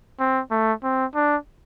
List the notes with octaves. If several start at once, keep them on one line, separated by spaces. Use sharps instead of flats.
C4
A3
C4
D4